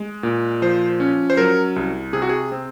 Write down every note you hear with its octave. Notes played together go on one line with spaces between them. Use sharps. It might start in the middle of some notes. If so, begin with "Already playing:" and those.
Already playing: G#3
A#2
F3 C5
C#4
C5
F#3 A#4
C2
C3 G#4
F#4
G#4
C4